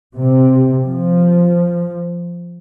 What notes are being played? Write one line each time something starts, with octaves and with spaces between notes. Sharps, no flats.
C3
F3